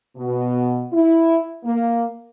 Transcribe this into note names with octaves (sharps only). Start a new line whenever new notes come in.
B2
E4
A#3